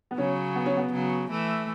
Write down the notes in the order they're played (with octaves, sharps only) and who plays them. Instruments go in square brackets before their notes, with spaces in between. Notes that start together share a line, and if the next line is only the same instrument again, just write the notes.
[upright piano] B3
[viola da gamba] C#3 F#3 [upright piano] C#4
[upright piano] B3
C#4
B3
[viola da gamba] C#3 F#3
E3 A3